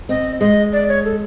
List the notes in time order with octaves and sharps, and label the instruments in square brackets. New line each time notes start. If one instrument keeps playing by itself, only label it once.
[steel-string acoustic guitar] C4 [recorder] D#5
[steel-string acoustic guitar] G#3 [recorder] D#5
[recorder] D5
C#5
A4